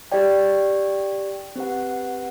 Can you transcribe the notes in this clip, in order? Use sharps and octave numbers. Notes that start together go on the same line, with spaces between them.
G4 D5 G5
C4 G4 B4 F#5